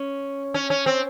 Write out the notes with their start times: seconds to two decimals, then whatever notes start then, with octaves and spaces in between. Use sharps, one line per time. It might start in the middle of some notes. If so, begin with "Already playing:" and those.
Already playing: C#4
0.54 C#4
0.70 C#4
0.86 C4